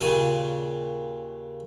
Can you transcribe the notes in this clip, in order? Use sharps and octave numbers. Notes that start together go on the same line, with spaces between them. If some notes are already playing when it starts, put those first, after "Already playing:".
D#2 A#2 C#3 G#5